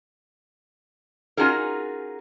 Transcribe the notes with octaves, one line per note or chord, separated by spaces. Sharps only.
C#4 D#4 F4 F#4 G#4 A#4